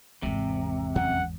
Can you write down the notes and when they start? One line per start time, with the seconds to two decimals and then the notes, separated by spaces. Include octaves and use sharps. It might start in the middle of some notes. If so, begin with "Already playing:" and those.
0.23 G#1 E2 C3
0.96 F2 F#3 C#4 F#5